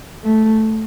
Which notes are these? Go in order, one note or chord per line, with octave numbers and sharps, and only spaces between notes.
A3